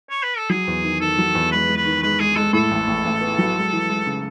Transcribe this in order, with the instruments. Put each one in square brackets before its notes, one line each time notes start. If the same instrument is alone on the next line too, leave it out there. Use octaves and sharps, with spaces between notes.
[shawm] C#5
B4
A4
[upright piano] F#3 [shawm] G#4
[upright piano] E2
D#3
[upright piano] D#3 [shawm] A4
[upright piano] F#3
E2
[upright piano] G#3 [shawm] B4
[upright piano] G#3
[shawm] B4
[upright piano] D#3
[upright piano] G#3 [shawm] B4
[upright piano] G#3 [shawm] G#4
[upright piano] G#3 [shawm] A4
[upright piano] A2 [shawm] A4
[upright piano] A1
A1
A1
B3
F#3
G#3
E3
G#3
C#3